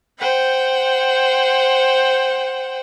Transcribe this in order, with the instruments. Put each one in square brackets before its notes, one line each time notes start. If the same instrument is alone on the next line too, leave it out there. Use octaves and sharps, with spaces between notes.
[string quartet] C5 F#5 G5